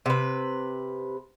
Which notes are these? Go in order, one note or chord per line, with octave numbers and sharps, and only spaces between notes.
C3 B4